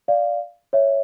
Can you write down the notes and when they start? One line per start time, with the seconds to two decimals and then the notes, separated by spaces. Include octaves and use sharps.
0.08 D5 F5
0.73 C#5 E5